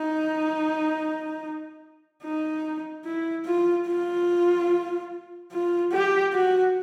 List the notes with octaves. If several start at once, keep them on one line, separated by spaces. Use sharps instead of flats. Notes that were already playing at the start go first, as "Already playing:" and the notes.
Already playing: D#4
D#4
E4
F4
F4
F4
G4
F#4